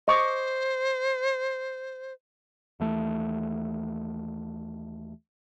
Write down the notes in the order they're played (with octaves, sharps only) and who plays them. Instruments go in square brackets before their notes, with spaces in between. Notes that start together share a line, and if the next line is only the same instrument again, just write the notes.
[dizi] C5 [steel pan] D#5 C#6 D6
[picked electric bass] D#2 E3 A3